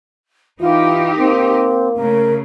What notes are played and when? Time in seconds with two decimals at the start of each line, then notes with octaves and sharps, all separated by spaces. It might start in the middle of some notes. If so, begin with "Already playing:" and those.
0.60 E3 D#4 F4 G4
1.17 A#3 C4
1.96 C#3 A3 A#4